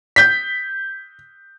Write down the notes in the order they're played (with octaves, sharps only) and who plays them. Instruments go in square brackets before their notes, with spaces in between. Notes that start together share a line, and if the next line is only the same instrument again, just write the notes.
[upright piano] G6 B6